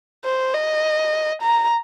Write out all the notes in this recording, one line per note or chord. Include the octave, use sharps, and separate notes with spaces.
C5
D#5
A#5